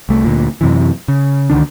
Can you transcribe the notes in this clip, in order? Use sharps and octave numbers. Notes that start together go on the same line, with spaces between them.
C2 A3
D2 A#2
F#2 C3 E3
C#3
C#2 D3 D#3 D4